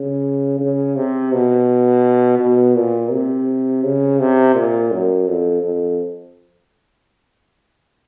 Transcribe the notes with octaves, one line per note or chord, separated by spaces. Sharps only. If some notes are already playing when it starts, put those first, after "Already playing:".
Already playing: C#3
C#3
C3
B2
B2
A#2
C3
C#3
C3
A#2
F#2
F2
F2